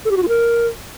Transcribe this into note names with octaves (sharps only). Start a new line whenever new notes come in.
A4
G4
F#4
F4
A#4